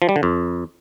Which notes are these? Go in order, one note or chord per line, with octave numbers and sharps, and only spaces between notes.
F3
G3
D3
F2